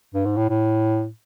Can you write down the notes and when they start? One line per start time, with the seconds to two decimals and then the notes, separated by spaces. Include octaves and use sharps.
0.14 G2
0.25 G#2
0.37 A2
0.49 A2